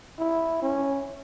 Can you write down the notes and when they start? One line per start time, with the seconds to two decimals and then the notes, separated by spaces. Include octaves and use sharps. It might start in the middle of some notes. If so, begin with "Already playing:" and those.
0.18 E4
0.62 C#4